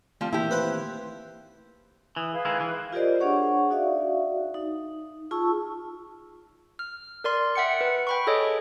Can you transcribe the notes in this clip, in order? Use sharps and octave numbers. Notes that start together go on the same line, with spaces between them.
F3 G3 A3 C4
D#3 E3 A#3 E4 G4
B4 C5
E3 D#6
G#4 B4 F5
D#3 G#3 E4
E3
F4 G4 A#4 C5 D5 D#5
D4 G#4 C#5 F#5 C#6
D#4 F#4 D5 E5 F5
D#4
F4 G#4 A5 C#6 E6
F6
A#4 D5 C6
E5 F#5 G5 C#7
B4
G5 B5 C#6
G#4 A4 C#5 D#5